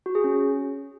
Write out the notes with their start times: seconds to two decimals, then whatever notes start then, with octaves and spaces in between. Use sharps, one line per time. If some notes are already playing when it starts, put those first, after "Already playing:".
0.06 F#4
0.15 G#4
0.24 C#4